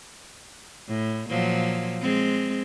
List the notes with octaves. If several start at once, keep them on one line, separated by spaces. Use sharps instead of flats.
A2
A#2 F3 F#3
G#3 C4